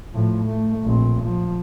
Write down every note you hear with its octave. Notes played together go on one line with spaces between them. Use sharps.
A2 F3
A3
A#1 C4
F3